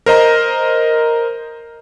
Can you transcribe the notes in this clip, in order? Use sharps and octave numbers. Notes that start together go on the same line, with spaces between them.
A#4 C5 D#5 A#5